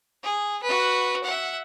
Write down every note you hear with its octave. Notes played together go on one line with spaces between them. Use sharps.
G#4
F#4 B4
E5 F#5